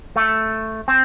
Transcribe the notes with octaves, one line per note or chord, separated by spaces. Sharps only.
A3
C4